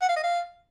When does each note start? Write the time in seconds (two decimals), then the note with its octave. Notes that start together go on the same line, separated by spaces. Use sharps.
0.02 F#5
0.09 F5
0.16 D#5
0.23 F5